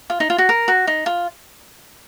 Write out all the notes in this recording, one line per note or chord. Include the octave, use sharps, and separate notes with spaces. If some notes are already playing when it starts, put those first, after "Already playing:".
F4
D#4
F4
F#4
A#4
F#4
D#4
F4